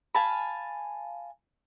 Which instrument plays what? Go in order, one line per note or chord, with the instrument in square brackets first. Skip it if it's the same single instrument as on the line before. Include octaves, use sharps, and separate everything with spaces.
[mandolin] F5 G#5 A5 B5